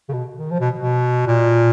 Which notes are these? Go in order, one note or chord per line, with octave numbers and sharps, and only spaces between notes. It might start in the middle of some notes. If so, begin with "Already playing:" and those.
C#3
B2
D#3
F3
B2
B2
A#2